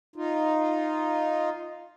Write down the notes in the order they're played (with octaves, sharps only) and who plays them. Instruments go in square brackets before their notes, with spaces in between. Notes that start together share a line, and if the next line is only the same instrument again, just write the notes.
[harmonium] D#4 F4